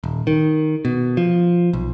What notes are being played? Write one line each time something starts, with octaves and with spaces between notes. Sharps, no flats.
D#1
D#3
B2
F3
B1